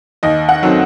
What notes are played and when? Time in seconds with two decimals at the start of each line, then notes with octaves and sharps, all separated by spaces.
0.23 D#2 D#5
0.49 F#5
0.63 D#3 F#3 A3 C4